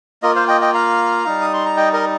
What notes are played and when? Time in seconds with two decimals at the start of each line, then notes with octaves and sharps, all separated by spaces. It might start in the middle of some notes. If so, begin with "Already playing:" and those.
0.22 A#3 F4 A#4 D#5
0.35 C5 F5
0.48 D#5 G5
0.61 D#5 G5
0.74 F5 A#5
1.26 G3 D#4
1.41 D#6
1.54 C6
1.66 A#5
1.77 D#5 G5
1.93 A#4 D#5